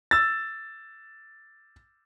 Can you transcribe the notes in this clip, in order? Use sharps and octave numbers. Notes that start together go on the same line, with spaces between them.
E6 A6